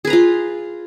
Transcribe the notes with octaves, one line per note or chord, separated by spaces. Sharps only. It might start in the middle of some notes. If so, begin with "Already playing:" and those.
F4 G#4 B4 A#5